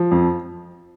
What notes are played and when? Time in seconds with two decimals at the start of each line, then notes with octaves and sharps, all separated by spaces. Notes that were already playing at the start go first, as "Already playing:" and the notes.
Already playing: F3
0.11 F2